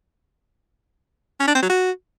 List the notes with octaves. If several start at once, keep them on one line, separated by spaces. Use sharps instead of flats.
C#4
D4
C4
F#3
F#4